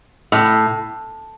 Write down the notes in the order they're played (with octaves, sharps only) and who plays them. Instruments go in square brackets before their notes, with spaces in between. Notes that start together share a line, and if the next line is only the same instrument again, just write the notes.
[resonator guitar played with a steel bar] A2